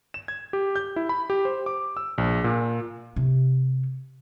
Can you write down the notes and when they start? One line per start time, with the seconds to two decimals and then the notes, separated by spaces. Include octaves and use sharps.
0.14 E7
0.28 G#6
0.53 G4
0.76 G6
0.96 E4
1.09 B5
1.30 G4
1.45 C5
1.66 D6
1.97 E6
2.18 A#1
2.44 A#2
3.16 C3 C#4